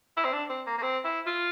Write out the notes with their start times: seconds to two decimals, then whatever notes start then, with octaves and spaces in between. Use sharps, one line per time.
0.17 E4
0.25 C4
0.33 D4
0.50 C4
0.67 A#3
0.78 A#3
0.83 C4
1.05 E4
1.27 F4